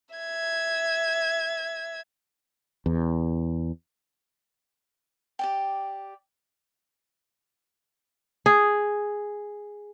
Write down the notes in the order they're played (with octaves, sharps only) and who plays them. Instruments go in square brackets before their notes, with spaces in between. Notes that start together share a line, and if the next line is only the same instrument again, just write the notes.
[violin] E5 G#6
[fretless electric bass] E2
[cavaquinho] G4 D5 G5
[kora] G#4